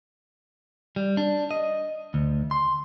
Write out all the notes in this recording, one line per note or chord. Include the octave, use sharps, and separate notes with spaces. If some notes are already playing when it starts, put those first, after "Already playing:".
G3
D4
D#5
D2
C6